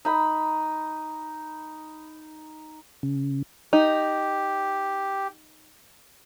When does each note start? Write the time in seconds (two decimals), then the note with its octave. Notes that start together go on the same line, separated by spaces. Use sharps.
0.05 D#4 B5
3.03 C#3
3.73 D#4 G4